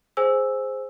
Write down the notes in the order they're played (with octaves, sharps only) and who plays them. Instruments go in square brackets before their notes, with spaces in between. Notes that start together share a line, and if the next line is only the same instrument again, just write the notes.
[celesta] G#4 C5 G#5 E6